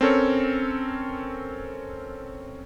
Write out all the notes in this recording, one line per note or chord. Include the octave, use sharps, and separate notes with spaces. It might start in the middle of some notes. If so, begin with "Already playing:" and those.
C4 C#4 A4 A#4 C#5